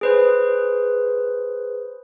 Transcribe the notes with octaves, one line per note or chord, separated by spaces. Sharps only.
G#4 B4 C5